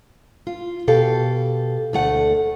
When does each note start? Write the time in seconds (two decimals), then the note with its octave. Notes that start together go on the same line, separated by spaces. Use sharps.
0.47 F4
0.88 B2 G4 A4 F5
1.93 D2 A3 F#5